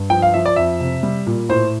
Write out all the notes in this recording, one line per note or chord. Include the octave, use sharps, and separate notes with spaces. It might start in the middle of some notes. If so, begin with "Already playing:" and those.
Already playing: G2
F3 G5
F5
F3 E5
D5
F2 E5
C3
G3
A#2
A2 C5